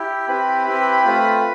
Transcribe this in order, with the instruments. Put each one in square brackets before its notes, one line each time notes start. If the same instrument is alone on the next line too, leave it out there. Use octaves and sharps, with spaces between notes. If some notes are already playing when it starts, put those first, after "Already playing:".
Already playing: [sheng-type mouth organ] E4 G4
C4 E4 G4 B4 B5
C4 E4 G4
A3 C4 F4